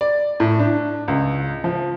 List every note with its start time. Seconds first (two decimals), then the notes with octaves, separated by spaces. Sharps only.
0.01 D5
0.40 A2
0.59 D4
1.08 C#2
1.64 F3